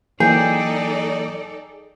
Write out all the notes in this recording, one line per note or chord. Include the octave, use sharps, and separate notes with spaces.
E3 F#3 A#3 D#4 G#4 A4 D5 G5